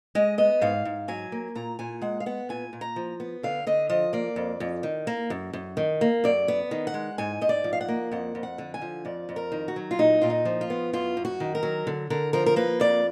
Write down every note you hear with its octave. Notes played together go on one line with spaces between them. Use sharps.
G#3 D#5
B3 D#5
G#2 F5
G#2
F#3 G#5
A#3
A#2 A#5
A#2 G#5
G#3 F#5
F5
B3 F#5
A#2 G#5
A#2
A#5
F3
B3
D3 F5
D3 D#5
F3 D#5
A#3 D5
F2
F2
D#3
A#3
F#2
F#2
D#3
A#3
F#2 D5
B3
D#3
F#5
G#3
G#2 G#5
G#2 D#5
D5
F3
F5
F#5
A#3
F2 F#5
F2
F#5
D3
G#5
F3
F2 D5
F2
A#4
D#3
F#4
F#3
F4
A#2 D#4
A#2 F4
D#4
F3
F4
B3
F#2 F4
F#2
F#4
D#3
A#4
F#3
D3
D3 A#4
F3 A#4
A#4
A#3 B4
F2 D5